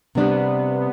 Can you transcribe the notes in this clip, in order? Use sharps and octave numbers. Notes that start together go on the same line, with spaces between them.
C3 G3 B3 D4